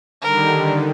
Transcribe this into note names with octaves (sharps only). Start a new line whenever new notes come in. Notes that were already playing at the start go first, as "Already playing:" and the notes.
D3 D#3 G3 A#4